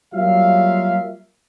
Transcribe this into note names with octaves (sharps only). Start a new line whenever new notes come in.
F#3 G3 A#3 F4 E5 F5